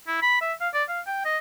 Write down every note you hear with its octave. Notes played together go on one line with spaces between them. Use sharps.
E4
B5
E5
F5
D5
F5
G5
D#5